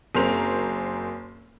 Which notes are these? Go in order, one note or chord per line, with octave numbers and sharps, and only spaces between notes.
F#1 F#2 C4 A#4 C5 F7